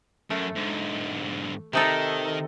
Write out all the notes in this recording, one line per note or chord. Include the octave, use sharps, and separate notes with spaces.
F#2 A3 A#4
G#2 D3
C3 D#3 D#4 A4